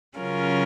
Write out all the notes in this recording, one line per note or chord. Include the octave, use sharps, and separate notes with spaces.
C#3 F#3 C#4 F4 A#4